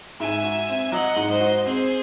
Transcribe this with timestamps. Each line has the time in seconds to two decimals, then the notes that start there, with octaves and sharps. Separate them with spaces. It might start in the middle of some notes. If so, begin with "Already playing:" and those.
0.20 G#2 E5 G#5
0.44 F#4
0.69 C4
0.92 F#3 D#5 F#5
1.16 G#2
1.29 C5 D#5
1.40 F#4
1.65 C4 G#4 C5